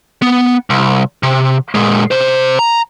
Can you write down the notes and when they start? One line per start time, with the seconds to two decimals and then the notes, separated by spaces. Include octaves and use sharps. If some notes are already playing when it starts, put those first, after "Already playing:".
0.22 B3
0.70 C2
1.23 C3
1.75 A#2 G#3
2.11 C3 C5
2.59 A#5